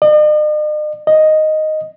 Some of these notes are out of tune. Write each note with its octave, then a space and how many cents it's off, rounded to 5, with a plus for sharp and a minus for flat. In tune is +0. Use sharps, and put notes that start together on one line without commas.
D#5 -45
D#5 +0